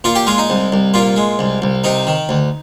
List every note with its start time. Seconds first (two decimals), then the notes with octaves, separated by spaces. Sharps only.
0.04 A#2 F4
0.15 G4
0.27 G#3 F4
0.38 D#4
0.50 C2
0.72 C2
0.94 A#2 F4
1.16 G#3
1.39 C2
1.62 C2
1.84 C3 D#4
2.07 D#3
2.29 D2